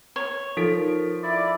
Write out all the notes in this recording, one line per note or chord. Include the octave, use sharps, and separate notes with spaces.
C#5
F3 D#4 A4 A#4 B6 D7
E4 D5